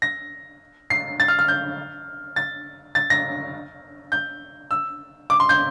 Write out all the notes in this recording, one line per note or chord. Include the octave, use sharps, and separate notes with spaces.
A#6
C7
A6
F6
F6
G6
A6
A6
A#6
G6
E6
D6
C6
G6